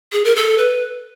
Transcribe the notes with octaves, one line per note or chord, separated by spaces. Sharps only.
G#4
A#4
A4
B4